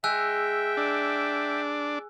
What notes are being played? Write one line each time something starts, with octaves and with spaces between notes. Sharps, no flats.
G#3 E5 G5 G#5 E6 F#6
D4